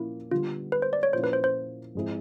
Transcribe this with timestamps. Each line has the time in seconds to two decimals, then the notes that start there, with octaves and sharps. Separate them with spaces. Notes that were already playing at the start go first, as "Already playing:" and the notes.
Already playing: A#2 F3 A#3 C#4 E4
0.31 D3 G3 B3 F4
0.72 B4
0.82 C5
0.93 D5
1.03 C#5
1.13 A#2 F3 A#3 C#4 E4 C5
1.24 B4
1.33 C5
1.44 C5
1.95 G#2 F3 G#3 C4 E4